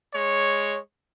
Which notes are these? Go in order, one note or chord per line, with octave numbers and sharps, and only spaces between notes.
G#3 C#5